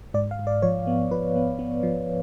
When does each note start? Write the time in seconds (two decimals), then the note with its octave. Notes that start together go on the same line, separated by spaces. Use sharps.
0.14 G#2 D5
0.31 F5
0.39 G#2
0.47 D5
0.62 F3 C#5
0.87 B3
1.11 F3 B4
1.36 B3
1.59 B3
1.83 F3